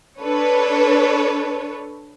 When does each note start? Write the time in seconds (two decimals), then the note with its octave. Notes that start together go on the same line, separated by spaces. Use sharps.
0.19 D4 A4 B4 C#5